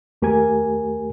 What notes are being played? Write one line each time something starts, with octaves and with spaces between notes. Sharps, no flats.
D#2 A3 G4 A#4 G#5 G#6